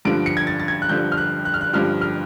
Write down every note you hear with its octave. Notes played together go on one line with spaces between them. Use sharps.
G2 D3 F3 D7
C#7
G#6
A6
A6
G#6
F#6
G2 D3 F3 G6
F6
F#6
F#6
F6
F#6
G2 D3 F3 F6
F6